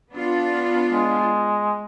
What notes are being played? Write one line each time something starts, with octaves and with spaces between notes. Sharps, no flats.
B3 D4 F4
G#3